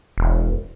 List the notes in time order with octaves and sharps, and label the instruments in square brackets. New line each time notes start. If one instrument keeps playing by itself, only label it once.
[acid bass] E1